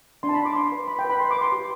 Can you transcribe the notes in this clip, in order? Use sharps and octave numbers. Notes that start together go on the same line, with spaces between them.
D4 C6
A5
B5
D4
D6
D4 C6
B4
B4 B5
G5
B4
B5
B4 C6
D6
B4 C6
G4